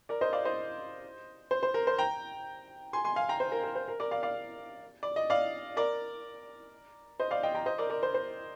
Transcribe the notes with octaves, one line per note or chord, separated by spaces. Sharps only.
A#4 D5
C5 D#5
D5 F5
C5 D#5
C5
C5
A#4
C5
G5 A#5
G#5 C6
G#5 C6
F5 G#5
G5 A#5
C5
A#4
A#4
C5
A#4
A#4 D5
D5 F5
D5 F5
D5
D#5
D5 F5
A#4 D5
C5 D#5
D5 F5
D#5 G5
G5 A#5
C5 D#5
A#4 D5
A#4 D5
C5
C5